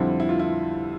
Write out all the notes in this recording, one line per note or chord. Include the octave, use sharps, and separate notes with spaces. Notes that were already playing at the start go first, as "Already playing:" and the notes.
Already playing: F2 D3 G3 C4 E4
E4
F4
E4